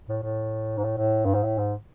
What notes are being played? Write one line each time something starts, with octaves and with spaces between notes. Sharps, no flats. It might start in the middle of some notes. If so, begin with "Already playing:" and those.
A2
A2
G#2
A2
A2
G2
G#2
A2
G#2